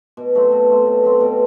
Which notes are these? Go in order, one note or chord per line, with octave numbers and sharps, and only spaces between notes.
B2
F#3 A3 C4
B2
F#3 A3 C4
B2
F#3 A3 C4
B2